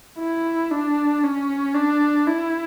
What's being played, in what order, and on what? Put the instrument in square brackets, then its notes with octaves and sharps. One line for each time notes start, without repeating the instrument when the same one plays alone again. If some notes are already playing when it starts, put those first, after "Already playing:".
[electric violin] E4
D4
C#4
D4
E4